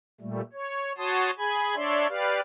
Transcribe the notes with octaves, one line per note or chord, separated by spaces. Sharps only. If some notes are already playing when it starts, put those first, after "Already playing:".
A#2 G3 A3
C#5
F#4 C#5 A5 C6 D#6
G#4 G#5 B5 G#6
D4 C#5 D5 E5 C6
G4 B4 D5 F5